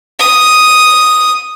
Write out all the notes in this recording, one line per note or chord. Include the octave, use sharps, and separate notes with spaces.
D#6